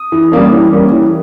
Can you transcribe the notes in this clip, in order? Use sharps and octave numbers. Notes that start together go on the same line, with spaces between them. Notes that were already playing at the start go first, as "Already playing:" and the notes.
Already playing: D#6
E3
G3 A#3 C#4
E3
G3 A#3 C#4
E3